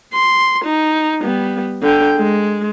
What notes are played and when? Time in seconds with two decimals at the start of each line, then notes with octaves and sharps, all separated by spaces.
0.14 C6
0.65 D#4
1.22 G3 B3
1.82 D3 G5
2.17 G#3